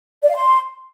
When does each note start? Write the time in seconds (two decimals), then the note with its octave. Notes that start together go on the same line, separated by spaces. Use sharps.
0.23 D5
0.29 F5
0.36 C6